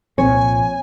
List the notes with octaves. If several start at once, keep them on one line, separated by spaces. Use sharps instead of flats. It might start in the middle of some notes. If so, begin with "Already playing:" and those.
C2 A#2 F3 C4 C#5 G#5